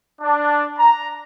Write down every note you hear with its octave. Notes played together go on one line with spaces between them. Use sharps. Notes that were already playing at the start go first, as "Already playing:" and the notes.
D4
A#5